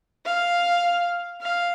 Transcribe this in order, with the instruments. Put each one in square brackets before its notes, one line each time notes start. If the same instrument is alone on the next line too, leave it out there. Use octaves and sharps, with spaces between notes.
[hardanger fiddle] F5
F5